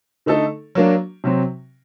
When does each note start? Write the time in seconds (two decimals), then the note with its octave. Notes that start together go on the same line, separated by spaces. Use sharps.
0.26 D3 A3 D#4 A4
0.75 F#3 A#3 D4
1.24 C3 F#3 C4